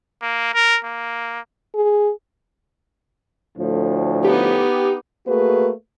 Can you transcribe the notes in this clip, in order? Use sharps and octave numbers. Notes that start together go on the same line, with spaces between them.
A#3
A#4
A#3
G#4
D2 A2 F3
B3 D#4 G4
A3 A#3 F#4 G#4 B4